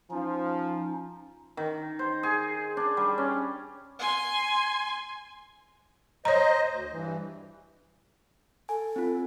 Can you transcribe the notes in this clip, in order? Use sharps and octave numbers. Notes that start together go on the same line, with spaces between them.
F3 C#4 D#4
D#3
C5
G#4
D4
G3
C#4
G#5 C6
C5 C#5 D#5 A#5
D2
G2 E3
A4 G#5
C4 F4